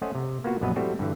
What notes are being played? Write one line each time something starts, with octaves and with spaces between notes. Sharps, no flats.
A3 C#4 C5 D#5 F#5
C3
A#3 B3 F4 F#4
A#1 F#2 F#3 B3 B4 D#5
G3 A3 C4 E4 F#4
G2 D3 E3